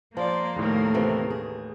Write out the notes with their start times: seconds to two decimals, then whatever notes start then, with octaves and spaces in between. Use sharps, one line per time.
0.17 F3 A#3 C5 D5 A5
0.56 D#2 A2 A3 A#4
0.94 C3 E3
1.30 G#4